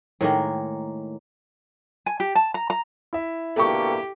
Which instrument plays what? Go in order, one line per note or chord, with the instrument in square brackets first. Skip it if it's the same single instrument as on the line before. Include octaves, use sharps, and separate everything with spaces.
[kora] A2 D#3 G#3 A#3
[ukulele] G#5
G4
A5
A#5
A#5
[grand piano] E4 E5
[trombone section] B2 D3 A#3 [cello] G4 [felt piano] A4 G5 C#6